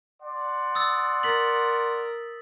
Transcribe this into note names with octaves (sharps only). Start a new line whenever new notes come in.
D5 F#5 C6
D#6 E6 A6
A#4 A6 B6 F#7